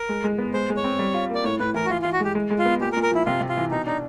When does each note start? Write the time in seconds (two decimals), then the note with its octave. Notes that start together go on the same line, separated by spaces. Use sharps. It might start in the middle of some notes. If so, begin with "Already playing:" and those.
Already playing: A#4
0.09 G#3
0.24 G#3
0.38 B3
0.54 G#3 C5
0.70 G#3
0.77 C#5
0.84 C4
0.99 G3
1.14 F4
1.29 A#3
1.35 D5
1.44 A2 C#5
1.60 A2 B4
1.74 E3 A#4
1.85 F#4
1.89 E3 F4
2.02 E3 F4
2.13 F#4
2.20 G#3 G4
2.35 G#3
2.50 G#3
2.59 F4
2.65 B3
2.80 A#2 G4
2.92 A#4
2.97 A#2
3.03 A#4
3.12 F3 E4
3.26 C3 F4
3.41 C3
3.49 F4
3.57 E3
3.71 B2 D#4
3.87 D4 D#4